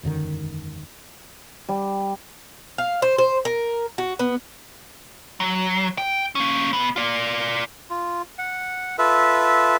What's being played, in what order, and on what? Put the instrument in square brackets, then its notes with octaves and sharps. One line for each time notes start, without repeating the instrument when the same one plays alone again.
[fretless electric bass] E1 F#2 D3 D#3
[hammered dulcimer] G3
[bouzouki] F5
C5
C5
A#4
F#4
B3
[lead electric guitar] F#3
G5
A#3 C#4
B2 B3
F4 D5
[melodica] F4
F#5
F4 A4 B4 E5